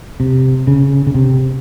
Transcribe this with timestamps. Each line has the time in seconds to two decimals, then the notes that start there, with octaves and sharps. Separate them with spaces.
0.20 C3
0.67 C#3
1.07 C#3
1.14 C3